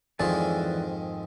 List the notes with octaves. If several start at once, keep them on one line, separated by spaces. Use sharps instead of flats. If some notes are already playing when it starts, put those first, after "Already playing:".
F2 G#2 D#3 E3 D5 G#5